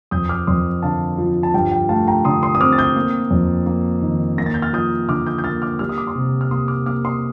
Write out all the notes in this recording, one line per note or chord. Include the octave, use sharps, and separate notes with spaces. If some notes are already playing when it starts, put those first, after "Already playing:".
F2 D#6 G6
D6 F6
F2 C6 D#6
D3 F5 A5
F3
A5
G2 G5
G5
A3 F5 A5
G5 A#5
D3 C6 D#6
C6 D#6
D#6
C4 D6 F6
A6
D#6 G6
A#3
F2
A#3
D#3
A#3 A#6
A6
G6
F6 A6
F3 D#6 G6
D3 D6 F6
D#6 G6
G6
A#3 F6 A6
D6 F6
G3 F6
D#6
D6
C6 D#6
C3
F6
A#3 C6 D#6
D6 F6
A#3 D6 F6
C6 D#6